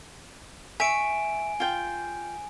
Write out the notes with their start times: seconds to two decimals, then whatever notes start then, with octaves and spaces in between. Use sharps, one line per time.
0.80 E5 G#5 C#6 D7
1.60 F4 G5